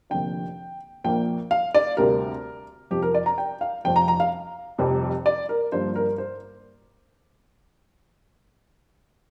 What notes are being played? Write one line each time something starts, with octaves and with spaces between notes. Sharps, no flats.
F1 F2 D3 A#3 G5
A#1 A#2 A#3 G5
F5
D5
D2 C3 G3 A#4
F2 C3 F3 G4
A#4
D5
A#5
G5
F5
F1 F2 F3 G5
A#5
A#5
F5
F1 F2 C3 G3
D5
A#4
G1 G2 F3 A#3 C5
A#4
C5